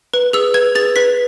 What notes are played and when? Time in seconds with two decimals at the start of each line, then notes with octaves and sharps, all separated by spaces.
0.14 B4
0.33 G#4 E6
0.54 B4 G#6
0.75 G#4 A6
0.96 B4 B6